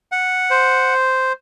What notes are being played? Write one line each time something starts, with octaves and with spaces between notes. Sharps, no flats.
F#5
C5